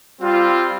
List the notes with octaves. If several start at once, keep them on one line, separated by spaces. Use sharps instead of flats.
G3 C4 F4